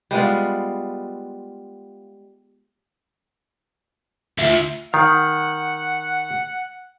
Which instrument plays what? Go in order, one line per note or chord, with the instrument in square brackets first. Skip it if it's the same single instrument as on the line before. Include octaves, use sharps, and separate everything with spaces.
[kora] G3 G#3 B3 F4
[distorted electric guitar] D2 [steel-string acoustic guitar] F4 E5
[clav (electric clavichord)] D#3 [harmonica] F#5